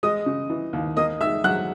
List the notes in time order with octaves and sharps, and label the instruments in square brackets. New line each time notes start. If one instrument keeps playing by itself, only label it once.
[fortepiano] G#3 [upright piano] D#5 D#6
[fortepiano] C#3
E3
D#2
[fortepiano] A#3 [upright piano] D#5 D#6
[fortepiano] D#3 [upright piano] E5 E6
[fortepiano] F#3 [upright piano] F#5 F#6